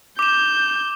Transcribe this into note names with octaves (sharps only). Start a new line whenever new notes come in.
D6 G6 E7